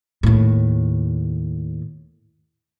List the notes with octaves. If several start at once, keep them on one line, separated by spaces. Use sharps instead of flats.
D#2 A2